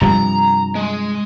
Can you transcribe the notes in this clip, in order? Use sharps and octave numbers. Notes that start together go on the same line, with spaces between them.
G2 C3 F3 A#5
G#3